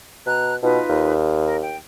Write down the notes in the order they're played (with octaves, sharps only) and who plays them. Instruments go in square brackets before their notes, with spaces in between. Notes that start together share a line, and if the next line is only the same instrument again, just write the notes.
[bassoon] B2 [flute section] A#5 F#6
[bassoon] B2 [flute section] D#4 F4 B4
[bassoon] D#2
[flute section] A#4
G5